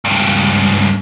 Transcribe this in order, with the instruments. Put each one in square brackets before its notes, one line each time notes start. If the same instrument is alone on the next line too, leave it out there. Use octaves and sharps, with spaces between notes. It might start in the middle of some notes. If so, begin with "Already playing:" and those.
[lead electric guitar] C#2 G2